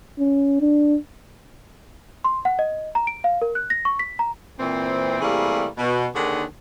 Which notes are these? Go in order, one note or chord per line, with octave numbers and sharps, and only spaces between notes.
C#4
D4
C6
F#5
D#5
A#5
D7
F5
A#4
F#6
A#6
C#6
B6
A#5
A#2 E3 C4
C3 E3 G3 A3 A#3 G#4
B2
D#2 D3 D#3 D4 G#4 F#5